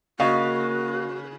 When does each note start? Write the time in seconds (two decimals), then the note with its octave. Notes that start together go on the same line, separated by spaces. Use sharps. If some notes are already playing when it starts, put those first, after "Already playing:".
0.20 C#3 A#3 F#4 D#5 F5